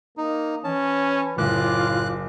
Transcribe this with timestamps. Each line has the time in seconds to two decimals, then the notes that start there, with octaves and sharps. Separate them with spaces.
0.17 A#3 D#4
0.64 E3 C#4 A5
1.38 F#1 A2 F4 D6 F#6